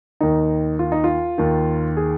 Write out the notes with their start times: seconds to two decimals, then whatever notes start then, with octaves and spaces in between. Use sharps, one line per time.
0.21 D#2 D#3 D#4
0.79 F4
0.92 D#4
1.04 F4
1.38 D#2 D#3
1.97 G#4